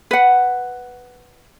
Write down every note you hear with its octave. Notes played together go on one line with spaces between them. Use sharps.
B4 F#5